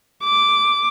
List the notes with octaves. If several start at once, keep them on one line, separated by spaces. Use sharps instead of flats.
D6